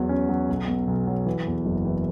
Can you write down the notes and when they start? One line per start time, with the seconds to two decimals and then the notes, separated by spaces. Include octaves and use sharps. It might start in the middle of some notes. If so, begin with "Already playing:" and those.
Already playing: E2 F#3
0.09 C#4
0.29 F#3
0.49 B1
0.68 B2
0.87 B1
1.07 F#3
1.26 E3
1.47 E2
1.66 F#1
1.85 E3